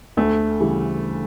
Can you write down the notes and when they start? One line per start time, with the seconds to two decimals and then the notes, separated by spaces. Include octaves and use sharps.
0.17 D2 A3
0.60 C#3 E3 G3